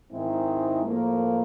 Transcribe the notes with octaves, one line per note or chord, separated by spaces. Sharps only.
G#2 D#3 G#3 C4 E4
A2 F3 A#3